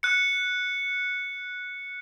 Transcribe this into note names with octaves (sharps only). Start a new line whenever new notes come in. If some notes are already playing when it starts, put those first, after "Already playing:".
F#6 C#7